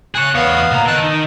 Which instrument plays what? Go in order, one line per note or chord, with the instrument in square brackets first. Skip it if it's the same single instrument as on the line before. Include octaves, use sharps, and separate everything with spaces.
[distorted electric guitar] G#4 C#5 [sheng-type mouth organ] F#6
[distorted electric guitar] E2 C#5 [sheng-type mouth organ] B3 F5 D#6
[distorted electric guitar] A#2 A#5
[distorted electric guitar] D#3 [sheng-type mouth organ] A5 E6 F#6
[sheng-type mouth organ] D#4